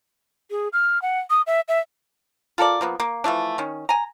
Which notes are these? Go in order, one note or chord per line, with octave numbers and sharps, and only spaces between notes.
G#4
F6
F#5
D#6
E5
E5
F4 A4 A#4 D5
F3 A#3 B3
A#3
E3 F3 A3 D4
D#3 C#4
G#5 A#5